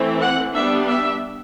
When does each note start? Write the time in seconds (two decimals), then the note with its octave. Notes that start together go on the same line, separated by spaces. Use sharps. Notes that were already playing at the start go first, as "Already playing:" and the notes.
Already playing: E3 A3 C4
0.21 F#5
0.54 G3 B3 D4 E5
0.88 E5